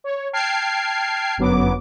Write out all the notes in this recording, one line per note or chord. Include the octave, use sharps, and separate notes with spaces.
C#5
G5 A5 F6 G#6 C7 D7
G1 F#2 F#3 B3 D6